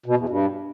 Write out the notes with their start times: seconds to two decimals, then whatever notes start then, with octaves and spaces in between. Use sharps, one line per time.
0.06 B2
0.17 E2
0.29 G2